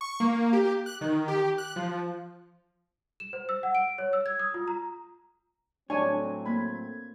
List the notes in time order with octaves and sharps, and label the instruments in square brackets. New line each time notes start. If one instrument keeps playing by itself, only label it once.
[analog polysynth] C#6
A#3
G4
F#6
D#3
G4
F#6
F3
[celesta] E7
C5
E6
F#5
D7
C#5
E6
G#6
D#6
F4
A#5
[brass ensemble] A2 F#3 C4 [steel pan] D4 G#5 [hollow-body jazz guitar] C#5
[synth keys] A#3 G#6 [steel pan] B5